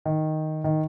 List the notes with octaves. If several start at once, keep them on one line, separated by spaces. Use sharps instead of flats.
D#3
D#3